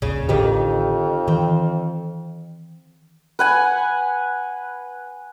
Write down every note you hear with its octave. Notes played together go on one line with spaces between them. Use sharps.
D#1 A#1 C#3
A1 F2 D3 D#3 G4
D#3 E3 C4
B4 F#5 G#5